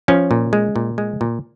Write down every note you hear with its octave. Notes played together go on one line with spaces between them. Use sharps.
F3 C#4
A#2
G#3
A#2
G#3
A#2